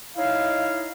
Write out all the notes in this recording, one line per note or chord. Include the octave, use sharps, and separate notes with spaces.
D#4 E4 C#5 D#5 F5